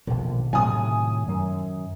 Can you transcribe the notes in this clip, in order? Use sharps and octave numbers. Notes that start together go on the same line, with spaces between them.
A#1 B2 D3 D#3
A2 C3 D#3 F#3 G#5 D#6
F#2